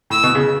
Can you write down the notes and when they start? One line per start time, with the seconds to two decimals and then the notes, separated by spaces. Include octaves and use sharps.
0.10 A2 E6
0.23 B2
0.35 C#3